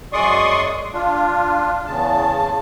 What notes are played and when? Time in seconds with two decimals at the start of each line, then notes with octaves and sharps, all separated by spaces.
0.13 F#2 G#3 D5 C6 C#6 D#6
0.94 D4 F4
1.87 E2 C#3 A5